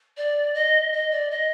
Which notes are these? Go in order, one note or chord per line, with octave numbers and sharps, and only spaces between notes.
D5
D#5
D#5
D5
D#5